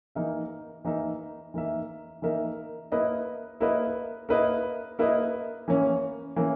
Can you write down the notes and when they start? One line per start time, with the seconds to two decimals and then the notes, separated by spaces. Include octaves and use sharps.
0.15 E3 A#3 D#4 A#4 E5
0.84 E3 A#3 D#4 A#4 E5
1.54 E3 A#3 D#4 A#4 E5
2.22 E3 A#3 D#4 A#4 E5
2.92 A#3 E4 B4 D#5
3.60 A#3 E4 B4 D#5
4.29 A#3 E4 B4 D#5
4.99 A#3 E4 B4 D#5
5.68 E3 A#3 C#4
6.36 E3 A#3 C#4